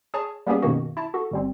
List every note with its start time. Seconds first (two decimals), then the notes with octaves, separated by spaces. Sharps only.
0.14 G#4 C#5 A5
0.47 G3 A#3 B3 C#4 G4 G#4
0.62 F#2 B2 D#3 A#3 F#4
0.97 E4 A5
1.14 F#4 A4
1.31 G1 G3 C4